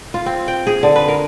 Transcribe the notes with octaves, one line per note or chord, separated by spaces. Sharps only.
F4
C4
G5
G#4
D3
B4
A#4